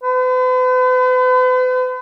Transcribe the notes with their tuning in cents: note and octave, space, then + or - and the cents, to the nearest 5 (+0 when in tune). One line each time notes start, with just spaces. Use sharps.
B4 +45